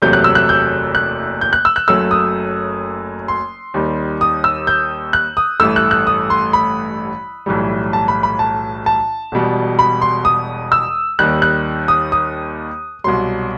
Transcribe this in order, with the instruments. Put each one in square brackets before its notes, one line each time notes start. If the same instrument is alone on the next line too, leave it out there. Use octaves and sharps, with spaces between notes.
[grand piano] F#1 E2 C3 F#3 A3 G6
F#6
E6
F#6
G6
F#6
G6
F#6
E6
F#6
F#1 F#2 F#3 A3 E6
D#6
C6
D#2 D#3 G3
D#6
E6
G6
F#6
D#6
A1 G2 E3 A3 E6
F#6
F#6
D#6
C6
B5
B1 A2 E3 G3
A5
B5
B5
A5
A5
E1 E2 B2 G3
B5
C6
D#6
E6
D#2 D#3 G3 F#6
F#6
D#6
D#6
C2 B2 F#3 C6